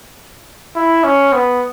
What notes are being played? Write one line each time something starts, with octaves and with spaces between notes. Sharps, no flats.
E4
C#4
B3